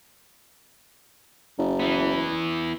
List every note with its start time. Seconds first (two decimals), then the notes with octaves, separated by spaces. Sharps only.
1.58 F#1
1.80 E3 B3